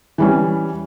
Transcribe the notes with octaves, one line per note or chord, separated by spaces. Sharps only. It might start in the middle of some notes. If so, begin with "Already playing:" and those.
E3 G3 C#4